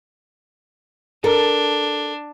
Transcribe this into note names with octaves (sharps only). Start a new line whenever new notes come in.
D4 A4 A#4